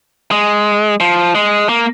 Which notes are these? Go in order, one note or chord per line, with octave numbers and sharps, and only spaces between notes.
G#3
F3
G#3
A#3